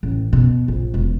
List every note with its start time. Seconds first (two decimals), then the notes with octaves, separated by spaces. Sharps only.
0.03 A1
0.33 B2
0.68 A#1
0.94 E1